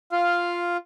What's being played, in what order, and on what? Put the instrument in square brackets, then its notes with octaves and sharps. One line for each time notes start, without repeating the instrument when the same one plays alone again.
[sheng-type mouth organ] F4 [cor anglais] F5